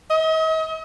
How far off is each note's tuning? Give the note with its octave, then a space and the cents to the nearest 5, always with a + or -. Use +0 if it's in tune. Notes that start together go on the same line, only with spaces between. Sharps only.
D#5 +40